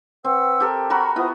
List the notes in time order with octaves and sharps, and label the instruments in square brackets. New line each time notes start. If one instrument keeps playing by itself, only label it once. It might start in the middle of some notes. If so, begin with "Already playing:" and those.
[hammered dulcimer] C4 [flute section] B4 F#5 E6
[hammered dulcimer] G4 A4 A#4
[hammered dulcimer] F#4 A#4 B5 [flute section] A#5 C#6
[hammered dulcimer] B3 E4 [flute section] F4 C5 D#6